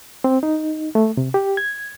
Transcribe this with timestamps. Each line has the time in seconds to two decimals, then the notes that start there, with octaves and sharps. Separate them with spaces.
0.24 C4
0.43 D#4
0.95 A3
1.17 C3
1.34 G4
1.57 G#6